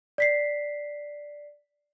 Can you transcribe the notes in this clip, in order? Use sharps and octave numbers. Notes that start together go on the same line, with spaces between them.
D5 B6 C7